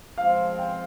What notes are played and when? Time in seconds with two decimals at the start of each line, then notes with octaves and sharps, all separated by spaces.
0.17 F3 G#3 C4 F4 F5
0.59 G5